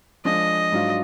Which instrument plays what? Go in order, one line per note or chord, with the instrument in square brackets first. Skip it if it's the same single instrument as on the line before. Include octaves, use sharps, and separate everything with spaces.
[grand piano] F3 G#3 D4 [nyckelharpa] D#5
[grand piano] G#2 F#3 D4 F4